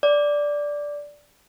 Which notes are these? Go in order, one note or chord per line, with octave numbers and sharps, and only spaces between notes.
D5